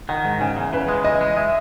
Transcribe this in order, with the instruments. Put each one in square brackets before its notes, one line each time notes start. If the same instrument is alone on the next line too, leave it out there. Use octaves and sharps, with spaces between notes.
[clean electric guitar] D#3 [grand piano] F#5
[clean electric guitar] G#2
[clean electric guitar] C#3 [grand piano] G#5
[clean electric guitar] E2
[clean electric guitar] C#3 [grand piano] B4
[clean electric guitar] G#3
[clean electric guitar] E3 [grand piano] D#5
[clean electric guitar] G#3
[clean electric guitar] G#3 [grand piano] E5